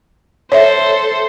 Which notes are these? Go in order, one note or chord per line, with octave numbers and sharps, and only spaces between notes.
A4 C5 C#5 E5